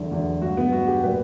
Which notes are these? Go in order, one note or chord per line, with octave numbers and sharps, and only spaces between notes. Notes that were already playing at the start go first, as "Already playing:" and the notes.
Already playing: E2 D3 F#3
E2 D3 F#3
G2 F#3 F#4
B3
G2 F#3 F#4
G4
A#2 F#3 B4